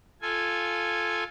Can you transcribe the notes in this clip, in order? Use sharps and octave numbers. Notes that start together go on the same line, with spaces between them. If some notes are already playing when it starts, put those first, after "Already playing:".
F4 A4 G#5